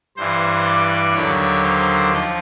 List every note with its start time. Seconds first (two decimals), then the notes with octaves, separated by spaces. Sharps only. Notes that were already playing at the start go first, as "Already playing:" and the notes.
0.17 G2 E3 C5
0.65 D5
1.14 D#2 D3 F#3 C#5
1.63 C5
2.11 F3